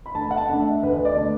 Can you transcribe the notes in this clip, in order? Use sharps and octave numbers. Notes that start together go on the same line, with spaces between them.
B5
D2 A5
F#5
A5
D3 A3 D4
E5
D2 B4
D5
D3 A3 D4